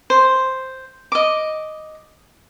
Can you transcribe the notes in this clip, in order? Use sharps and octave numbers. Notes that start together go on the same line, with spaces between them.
C5
D#5 D6